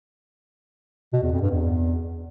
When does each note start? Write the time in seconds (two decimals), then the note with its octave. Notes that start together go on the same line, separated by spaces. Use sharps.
1.13 B2
1.22 E2
1.32 F2
1.42 G2
1.51 E2